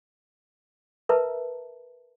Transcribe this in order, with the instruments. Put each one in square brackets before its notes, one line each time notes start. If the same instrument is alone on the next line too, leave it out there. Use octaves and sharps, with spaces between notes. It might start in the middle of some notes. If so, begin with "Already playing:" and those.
[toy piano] A#4 B4 E5 A5 A#5